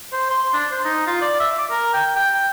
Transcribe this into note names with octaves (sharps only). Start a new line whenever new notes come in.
C5
C6
D4
C5
D#4
F4
D5
E5
D6
A#4
G5
G5